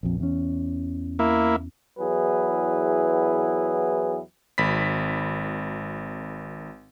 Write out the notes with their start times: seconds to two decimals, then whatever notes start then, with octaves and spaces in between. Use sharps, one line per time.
0.03 A#1 F2
0.20 E2 C#4
1.19 A#3 E4
1.99 E2 F#3 E4 G#4 B4
4.58 G#1 B5 B6